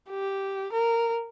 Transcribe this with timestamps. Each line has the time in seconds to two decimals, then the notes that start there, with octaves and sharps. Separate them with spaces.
0.10 G4
0.72 A#4